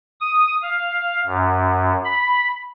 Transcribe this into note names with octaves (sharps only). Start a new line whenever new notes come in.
D#6
F5
F#2
B5